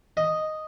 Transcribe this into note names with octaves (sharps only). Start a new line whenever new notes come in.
D#5